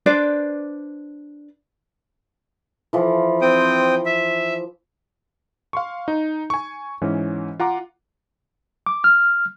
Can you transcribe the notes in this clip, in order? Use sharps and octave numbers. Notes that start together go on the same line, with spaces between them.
D4 B4 C5 D5
E3 F3
C4 G5 D#6
E5
F5 C6 C#6
D#4
G#5 C#6
G#2 E3 C#4
F4 F#5 A#5 D6
D6
F6